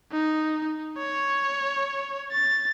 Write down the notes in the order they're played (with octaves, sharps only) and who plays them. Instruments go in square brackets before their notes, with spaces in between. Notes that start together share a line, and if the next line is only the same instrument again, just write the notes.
[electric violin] D#4
C#5
A6